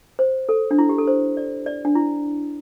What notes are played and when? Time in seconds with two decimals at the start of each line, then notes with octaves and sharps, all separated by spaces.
0.19 C5
0.49 A4
0.71 D4
0.78 E4
0.89 G4
0.98 A4
1.07 C5
1.37 D5
1.66 D5
1.85 D4
1.95 E4